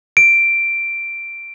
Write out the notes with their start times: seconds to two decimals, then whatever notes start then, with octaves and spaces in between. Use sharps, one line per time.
0.17 D7